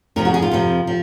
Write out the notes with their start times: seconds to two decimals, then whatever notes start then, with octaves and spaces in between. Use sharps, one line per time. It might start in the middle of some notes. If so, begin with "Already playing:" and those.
0.16 F2 C3 F3 A#4
0.25 F#4
0.34 G#4
0.42 F4
0.51 F2 C3 F3
0.87 F3